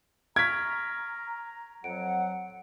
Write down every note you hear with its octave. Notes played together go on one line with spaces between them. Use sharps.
A#5 C#6 F6 G#6 B6 D7
F2 F#3 F#5 D7